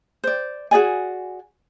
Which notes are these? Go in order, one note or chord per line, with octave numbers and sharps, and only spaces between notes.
C5 D5
F#4 G#4 D5 G#5